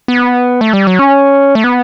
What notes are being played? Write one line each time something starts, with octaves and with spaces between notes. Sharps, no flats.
B3
A3
G3
F#3
C#4
A3
B3